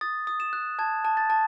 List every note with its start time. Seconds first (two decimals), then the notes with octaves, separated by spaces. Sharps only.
0.01 D#6 A6
0.27 D#6
0.40 E7
0.53 F#6
0.79 A5 G#6
1.05 A5
1.17 A6
1.30 A5